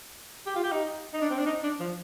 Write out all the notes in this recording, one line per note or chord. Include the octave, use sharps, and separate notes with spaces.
G4
F4
G4
D#4
D#4
D4
C4
D4
D#4
D4
F3